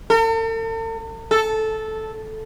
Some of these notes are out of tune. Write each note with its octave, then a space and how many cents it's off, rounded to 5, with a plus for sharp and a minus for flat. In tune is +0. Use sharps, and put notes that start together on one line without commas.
A4 +45
A4 -10